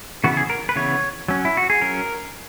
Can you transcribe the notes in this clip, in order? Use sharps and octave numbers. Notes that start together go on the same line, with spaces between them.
C#3 E3 B3 F#4
G#4
A#4
B4
C#3 E3 B3 C#5
F#3 C#4
E4
F#4
G#4
F#3 C#4 A#4